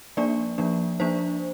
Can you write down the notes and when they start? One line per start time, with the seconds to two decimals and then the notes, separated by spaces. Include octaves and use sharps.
0.17 F3 A#3 D4 D5
0.58 F3 A#3 D4
1.00 F3 A#3 D4 C5